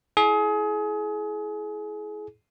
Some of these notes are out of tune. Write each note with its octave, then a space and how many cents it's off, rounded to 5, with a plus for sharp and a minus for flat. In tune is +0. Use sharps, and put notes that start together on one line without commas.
E4 +0 G#4 +30